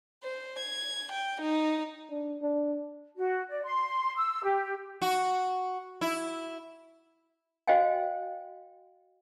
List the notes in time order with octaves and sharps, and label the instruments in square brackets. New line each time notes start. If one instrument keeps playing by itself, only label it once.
[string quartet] C5
G#6
G5
D#4
[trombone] D4
D4
[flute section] F#4
D5
C6
E6
G4
[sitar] F#4
E4
[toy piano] F#4 C5 D#5 F5 G5 G#5